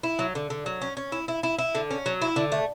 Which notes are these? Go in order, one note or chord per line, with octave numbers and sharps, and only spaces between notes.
E4
F#3
D3
D3
F#3
C#4
C#4
E4
E4
E4
E4
D3
C#4
F#3
E4
D3
A3